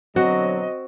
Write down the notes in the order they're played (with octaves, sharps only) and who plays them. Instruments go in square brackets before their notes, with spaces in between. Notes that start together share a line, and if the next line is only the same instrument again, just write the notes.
[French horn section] B2 D3 F#3 [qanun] C4 [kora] F#4 [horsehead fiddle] D#5